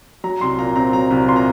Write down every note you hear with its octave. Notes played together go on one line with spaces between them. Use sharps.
F#3 A#5
C2 C6
A#2 A#5
C4 A#5
F#3 A#5
C2
A#2 C6
A#5